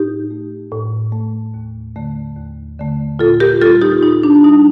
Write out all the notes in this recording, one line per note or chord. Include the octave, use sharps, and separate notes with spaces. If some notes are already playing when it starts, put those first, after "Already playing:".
Already playing: A2 D#4 G4
A3
A2
A3
D#2
D3 A3
D#2
D3 A3
A#2 F4 A4
G4 A#4
G3 F4 A4
D#4 G4
A#2 D#4
D4
G3 D#4